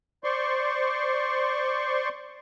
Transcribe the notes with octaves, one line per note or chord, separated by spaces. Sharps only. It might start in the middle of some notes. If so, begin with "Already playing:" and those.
C5 D5 C6 C#6